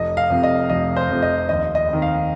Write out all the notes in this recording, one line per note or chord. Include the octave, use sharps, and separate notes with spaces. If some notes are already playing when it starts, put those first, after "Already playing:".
Already playing: F1 D#5
F5
F2 C3
D#5
F1 D#5
C5
F2 C3
D#5
D#2 D#5
D#5
D#3 C4
F5